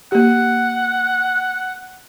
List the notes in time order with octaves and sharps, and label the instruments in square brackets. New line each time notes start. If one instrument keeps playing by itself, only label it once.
[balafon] A#3 G4 [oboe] F#5